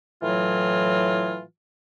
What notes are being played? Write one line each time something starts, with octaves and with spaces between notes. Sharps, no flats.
A2 E3 F#3 F4